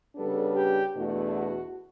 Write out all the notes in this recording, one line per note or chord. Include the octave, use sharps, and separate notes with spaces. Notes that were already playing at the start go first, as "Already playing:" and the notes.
C#3 G3 B3 D4 A4
G4
E2 B2 A3 D4 F#4
F#4